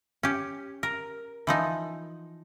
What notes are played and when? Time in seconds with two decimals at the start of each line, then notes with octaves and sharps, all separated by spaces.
0.23 C#4 G4
0.83 A#4
1.47 E3 F3 D#4